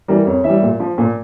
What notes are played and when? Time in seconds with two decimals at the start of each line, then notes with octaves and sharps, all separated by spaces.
0.08 E3 G3 A#4
0.26 F2 C#5
0.44 E3 G3 E5
0.62 A#2
0.80 F3
0.98 A#2